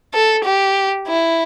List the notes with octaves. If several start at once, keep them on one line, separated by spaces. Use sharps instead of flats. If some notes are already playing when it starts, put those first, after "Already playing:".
A4
G4
E4